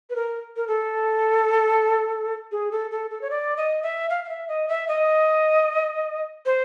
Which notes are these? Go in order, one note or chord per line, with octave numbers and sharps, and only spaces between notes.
B4
A#4
A#4
A4
G#4
A4
A4
A4
C#5
D5
D#5
E5
F5
F5
E5
D#5
E5
D#5
C5